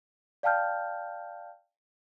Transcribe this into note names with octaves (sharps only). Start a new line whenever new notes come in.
D5 F5 G5 A5 F6 G6